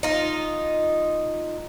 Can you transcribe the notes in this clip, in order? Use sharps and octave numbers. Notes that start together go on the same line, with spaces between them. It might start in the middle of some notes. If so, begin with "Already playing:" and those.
D#4 F4